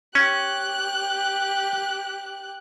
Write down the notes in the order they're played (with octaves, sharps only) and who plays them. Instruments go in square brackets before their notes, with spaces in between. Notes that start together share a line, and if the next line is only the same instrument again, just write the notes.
[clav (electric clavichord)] C#4 [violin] G4 F#6